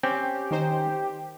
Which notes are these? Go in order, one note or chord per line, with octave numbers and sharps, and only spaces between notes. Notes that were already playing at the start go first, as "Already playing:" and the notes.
C4 C#4 G4 G5
D#3 D#4 C5